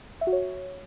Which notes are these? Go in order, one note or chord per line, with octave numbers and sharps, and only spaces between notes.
E5
F#4
C#5